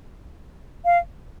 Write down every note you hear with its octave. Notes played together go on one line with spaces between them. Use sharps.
F5